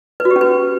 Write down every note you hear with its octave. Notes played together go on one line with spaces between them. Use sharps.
B4
F#4
G4
C#4
B4